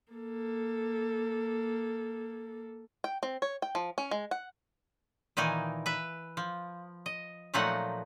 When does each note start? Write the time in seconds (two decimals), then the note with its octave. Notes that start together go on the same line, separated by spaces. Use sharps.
0.13 A#3 A4
3.04 G5
3.23 C4
3.42 C#5
3.62 G5
3.75 F3
3.98 C#4
4.11 G#3
4.31 F#5
5.37 A#2 D#3 E3 D#4 G#5
5.86 B4 E5
6.37 F3
7.06 D#5
7.54 A#2 F3 F#3 A3 D#4 F#5